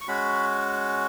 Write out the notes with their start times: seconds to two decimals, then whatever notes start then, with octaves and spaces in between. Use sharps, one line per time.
0.01 C#6
0.08 G#3 C#4 F#4 B5